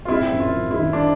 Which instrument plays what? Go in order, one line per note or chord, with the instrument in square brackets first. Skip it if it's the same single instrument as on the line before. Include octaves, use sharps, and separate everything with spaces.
[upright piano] F4
[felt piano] C4 [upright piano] E4
[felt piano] F#2
[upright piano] F4
[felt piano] F#2
[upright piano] E4
[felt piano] D#3
[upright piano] D4